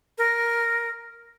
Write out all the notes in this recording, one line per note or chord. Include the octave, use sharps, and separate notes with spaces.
A#4